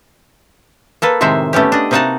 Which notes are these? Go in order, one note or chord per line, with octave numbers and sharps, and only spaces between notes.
A#3 A4 B4
A2 C3 D#3 G#3 C5 E5
A3 B3 C#4 G4
D4 D#5
C3 A#3 D#4 F#4 F#5 A5